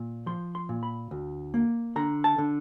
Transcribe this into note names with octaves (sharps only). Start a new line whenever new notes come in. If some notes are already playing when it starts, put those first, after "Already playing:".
Already playing: A#2
F3 C6
C6
A#2
B5
D2
A#3
D3 A#5
A5
D3